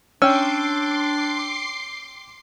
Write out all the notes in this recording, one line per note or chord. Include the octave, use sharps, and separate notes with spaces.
C#4 D4 G5 C6 D6 E6 C7